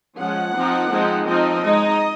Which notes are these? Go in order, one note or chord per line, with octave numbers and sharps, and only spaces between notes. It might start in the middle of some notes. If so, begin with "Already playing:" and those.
F3 G#3 C#4 F#5
F3 C4 D#4
F3 G#3 C4 D#4
F3 C4 D#4 D#5
G#3 D#4